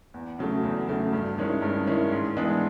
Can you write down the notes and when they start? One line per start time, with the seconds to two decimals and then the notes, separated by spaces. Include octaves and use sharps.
0.14 E2
0.39 C#3 F#3 A3
0.63 E2
0.89 C#3 F#3 A3
1.13 G2
1.38 D#3 G#3 C#4 E4
1.62 G2
1.87 D#3 G#3 C#4 E4
2.12 G#2
2.37 E3 G#3 B3 D4